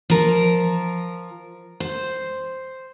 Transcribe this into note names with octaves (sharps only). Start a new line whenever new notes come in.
F3 A#4
C5